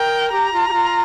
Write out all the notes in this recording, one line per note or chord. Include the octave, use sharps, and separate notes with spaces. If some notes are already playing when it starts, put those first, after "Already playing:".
Already playing: A#4 G5
G4 A#5
F4
G4
F4